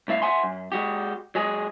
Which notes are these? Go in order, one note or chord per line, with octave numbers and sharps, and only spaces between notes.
C2 A2 E5 F5
E5 F#5 G#5 C6
F#2
G#3 F#4 G4
F#3 G#3 G#4